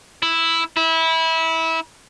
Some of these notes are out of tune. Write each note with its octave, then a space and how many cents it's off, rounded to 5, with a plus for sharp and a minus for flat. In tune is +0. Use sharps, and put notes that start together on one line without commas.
E4 +0
E4 -20